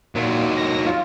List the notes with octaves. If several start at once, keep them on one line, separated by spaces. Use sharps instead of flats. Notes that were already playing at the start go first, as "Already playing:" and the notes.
D#2 A#2 F#3
A#6
F4